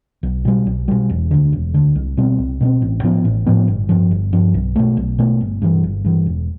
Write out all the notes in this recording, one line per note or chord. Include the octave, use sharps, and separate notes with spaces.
B1
B2 G3
B1
B2 G3
E1
D2 D3
E1
D2 D3
C2
B2 G3 C4
C2
B2 G3 C4
A1
A2 F3 B3
A1
A2 F3 B3
G1
G2 F3
G1
G2 F3
B1
B2 A3
B1
B2 A3
G1
G2 E3
G1
G2 E3
E1